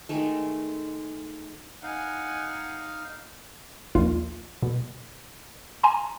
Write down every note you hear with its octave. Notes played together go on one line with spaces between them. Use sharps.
D#3 G#3 A3
D#4 F5 F#5 G#5
A#1 D#2 F4
B2
G#5 A#5 C6